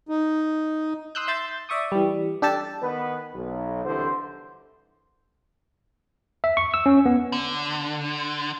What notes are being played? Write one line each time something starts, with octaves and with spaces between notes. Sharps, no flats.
D#4
C6 D#6 E6 F#6 G6
E5 C6 E6 G6 A6
D5 E5 C#6 D#6
E3 G3
D4 G4 A4 A5
D#3 B3 B4
B1
C2 D3 E3 C5
E5
C#6
E6
C#4
B3
D3